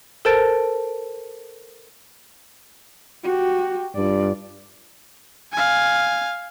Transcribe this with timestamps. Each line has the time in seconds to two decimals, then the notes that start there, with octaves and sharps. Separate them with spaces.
0.25 A4 A#4 C5 A5 A6 D7
3.24 F#4 G4
3.96 G2 F4 D5
5.53 F5 G#5